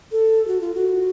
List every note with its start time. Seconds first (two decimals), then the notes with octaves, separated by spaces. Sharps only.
0.12 A4
0.48 F#4
0.61 F4
0.74 F#4